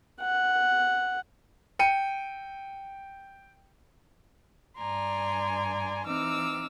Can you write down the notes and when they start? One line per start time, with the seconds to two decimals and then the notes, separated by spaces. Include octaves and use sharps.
0.21 F#5
1.79 G5 C#7 D#7
4.77 G2 D5 G#5 A#5 C6
6.07 E3 C4 D#4 D6 E6 F6